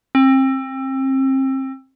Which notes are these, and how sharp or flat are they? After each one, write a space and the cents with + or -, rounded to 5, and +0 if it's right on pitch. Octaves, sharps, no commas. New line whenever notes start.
C4 +30